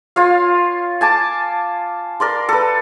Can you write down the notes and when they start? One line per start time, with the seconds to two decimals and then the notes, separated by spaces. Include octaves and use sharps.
0.16 F4 C#5 F5
1.01 G#5 A5 D6
2.20 A#4 D5 C6
2.49 A4 B4